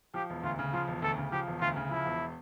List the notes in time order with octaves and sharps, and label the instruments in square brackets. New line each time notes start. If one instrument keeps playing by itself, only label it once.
[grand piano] F3 [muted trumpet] G4
[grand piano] E1
[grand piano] D2 [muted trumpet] F4
[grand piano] C#3
[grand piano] F3 [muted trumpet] F4
[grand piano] E1
[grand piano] D2 [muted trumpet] A4
[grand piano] C#3
[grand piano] F3 [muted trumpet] G4
[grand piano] E1
[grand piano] D2 [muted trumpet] F4
[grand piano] C#3
[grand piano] F3 [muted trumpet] E4
[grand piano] E1